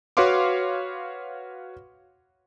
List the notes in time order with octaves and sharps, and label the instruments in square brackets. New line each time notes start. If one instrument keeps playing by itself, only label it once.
[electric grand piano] F#4 B4 C#5 F5 C6 D6